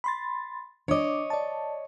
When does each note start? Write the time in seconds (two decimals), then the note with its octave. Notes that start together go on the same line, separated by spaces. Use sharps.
0.04 B5 C6 A6
0.88 D4 C#5 D#5 D6
1.30 D5 A5